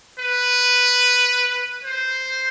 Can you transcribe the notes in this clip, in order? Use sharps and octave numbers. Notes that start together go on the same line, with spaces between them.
B4
C5